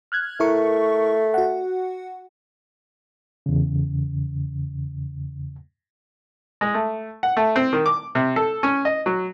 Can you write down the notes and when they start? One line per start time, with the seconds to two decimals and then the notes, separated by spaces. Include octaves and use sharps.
0.12 F6 F#6 G#6
0.40 A3 E4 A#4 C#6
1.34 F#4 F#5
3.46 E2 C#3
6.61 G#3
6.74 A3
7.23 F#5
7.37 A3
7.56 C4
7.73 D#3
7.86 D6
8.15 C3
8.36 A4
8.63 C#4
8.85 D#5
9.06 F#3